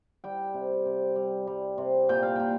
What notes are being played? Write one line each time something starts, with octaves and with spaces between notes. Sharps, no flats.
G3 G5
C3
C3
G3
G3
C3
A#2 G5
F5
A#2 G5